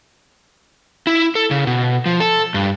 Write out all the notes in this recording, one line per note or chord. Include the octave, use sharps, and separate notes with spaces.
E4
A4
C#3
B2
F3
A4
G2